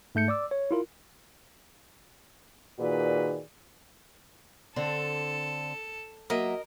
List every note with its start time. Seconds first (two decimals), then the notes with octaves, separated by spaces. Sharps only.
0.15 G#2 A3 G6 C#7
0.28 D5 D6 E6
0.51 C#5
0.71 E4 F4 A#4
2.79 A#2 D#3 F#4 G#4 B4 D5
4.76 D3 C4 D4 A4
6.30 F#3 A#3 A#4 D#5 E5